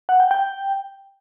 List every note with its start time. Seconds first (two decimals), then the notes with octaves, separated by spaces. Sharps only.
0.09 F#5
0.20 G5
0.31 G5